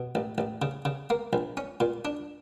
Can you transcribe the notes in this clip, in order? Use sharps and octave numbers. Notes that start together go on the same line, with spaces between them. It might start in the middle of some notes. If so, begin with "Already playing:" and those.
Already playing: B2
A1
A1
C#3
C#3
A#3
A#1
C#4
A#2
D4